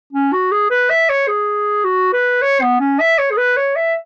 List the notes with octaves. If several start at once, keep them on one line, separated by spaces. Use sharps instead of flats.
C#4
F#4
G#4
B4
E5
C#5
G#4
F#4
B4
C#5
B3
C#4
E5
C#5
G#4
B4
C#5
E5